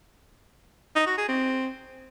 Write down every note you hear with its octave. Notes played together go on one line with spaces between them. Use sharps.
D#4
F#4
G#4
C4